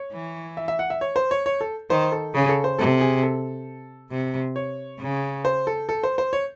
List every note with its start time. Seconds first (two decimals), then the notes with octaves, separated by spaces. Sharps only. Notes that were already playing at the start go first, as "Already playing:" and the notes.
Already playing: C#5
0.12 E3
0.57 E5
0.68 E5
0.79 F#5
0.90 E5
1.01 C#5
1.16 C5
1.31 C#5
1.46 C#5
1.61 A4
1.90 D#3 C5
2.12 A4
2.34 C#3 G#4
2.49 A4
2.64 C5
2.79 C3 A4
3.01 G#4
3.23 A4
4.11 C3
4.56 C#5
5.00 C#3
5.45 C5
5.67 A4
5.89 A4
6.03 C5
6.18 C5
6.33 C#5